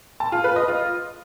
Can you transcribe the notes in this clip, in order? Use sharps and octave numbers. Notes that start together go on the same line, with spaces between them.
A5
F4
B4
D#5
F4